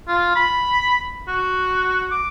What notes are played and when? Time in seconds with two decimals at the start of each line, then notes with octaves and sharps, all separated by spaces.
0.08 F4
0.35 B5
1.28 F#4
2.11 D6